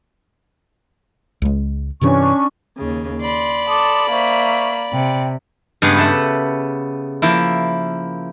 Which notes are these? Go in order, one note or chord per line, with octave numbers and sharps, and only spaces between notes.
C#2 G#3
G2 C3 E3 C#4 D4 C#6
D#2 C#3
D5 B5 C6
A4 C6 D6 D#6
A#3 C5 E5 C#6
C3 G5
G2 C#3 G#3 B3
G4 A4 E5 F#5
F3 A#3 E4